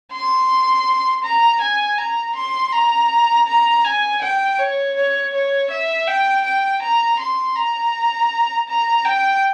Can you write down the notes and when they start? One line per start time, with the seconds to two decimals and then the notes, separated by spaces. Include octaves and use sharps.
0.13 C6
1.24 A#5
1.61 G#5
1.98 A#5
2.36 C6
2.73 A#5
3.47 A#5
3.84 G#5
4.22 G5
4.59 C#5
4.96 C#5
5.34 C#5
5.71 E5
6.07 G5
6.45 G5
6.82 A#5
7.19 C6
7.56 A#5
8.69 A#5
9.05 G5